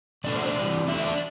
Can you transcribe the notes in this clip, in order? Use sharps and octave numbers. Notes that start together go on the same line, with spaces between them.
B2 A3 D4 D5
C5
D5
C3 E3 G3
E2 D3 A3 D4 E5
D5